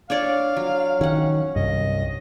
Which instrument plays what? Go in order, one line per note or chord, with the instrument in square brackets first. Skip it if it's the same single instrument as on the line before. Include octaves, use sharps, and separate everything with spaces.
[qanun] D4 C#5 D5 [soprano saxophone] F5
[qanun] F#3
[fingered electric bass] D#3 [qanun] C#4 F#5
[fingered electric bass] C2 G2 [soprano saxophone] D#5